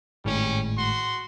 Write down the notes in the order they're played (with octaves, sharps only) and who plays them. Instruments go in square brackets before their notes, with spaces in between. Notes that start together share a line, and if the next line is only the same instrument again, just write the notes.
[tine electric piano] G#1 A2 G#3 [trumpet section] G3 C#4
[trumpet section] F#4 C6